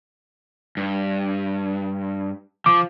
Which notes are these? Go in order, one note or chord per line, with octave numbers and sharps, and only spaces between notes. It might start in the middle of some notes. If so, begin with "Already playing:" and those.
G2
F3 D6